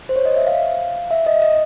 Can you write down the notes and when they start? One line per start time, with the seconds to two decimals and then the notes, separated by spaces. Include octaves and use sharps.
0.09 C5
0.16 C#5
0.25 D#5
0.36 E5
0.47 F5
1.11 E5
1.26 D#5
1.42 D#5